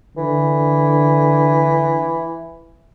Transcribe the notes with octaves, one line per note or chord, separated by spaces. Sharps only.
D3 E3